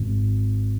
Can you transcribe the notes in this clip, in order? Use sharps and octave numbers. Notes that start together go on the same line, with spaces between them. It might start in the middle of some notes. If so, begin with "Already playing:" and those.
Already playing: G#1 G#2